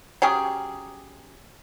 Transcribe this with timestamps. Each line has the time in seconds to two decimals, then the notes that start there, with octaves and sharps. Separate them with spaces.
0.22 F#3 C#4 G4 G#4